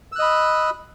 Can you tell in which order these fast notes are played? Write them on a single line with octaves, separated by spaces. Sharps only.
E6 F#6 D#5 B5